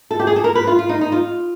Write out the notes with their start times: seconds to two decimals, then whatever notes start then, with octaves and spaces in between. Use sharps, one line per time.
0.11 A4
0.19 G4
0.27 G#4
0.36 A4
0.44 A#4
0.55 B4
0.67 F4
0.79 F4
0.89 D#4
1.01 D#4
1.12 F4